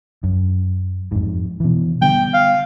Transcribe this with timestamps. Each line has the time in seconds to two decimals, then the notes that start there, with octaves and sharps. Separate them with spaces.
0.24 F#2
1.12 F2 G#2
1.60 B2 E3
2.02 D3 G3 B3 G5
2.34 F5